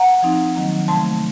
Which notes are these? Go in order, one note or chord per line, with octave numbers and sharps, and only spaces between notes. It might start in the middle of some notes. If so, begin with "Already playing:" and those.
Already playing: F#5 A#5
F3 C4 D#4
D#3 F#3 A#3
C3 F3 A3 A5 C6